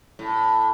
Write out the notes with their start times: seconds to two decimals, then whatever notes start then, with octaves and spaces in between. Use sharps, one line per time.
0.19 A2